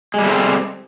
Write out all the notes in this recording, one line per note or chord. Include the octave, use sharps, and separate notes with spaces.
G3 G#3 C4 A4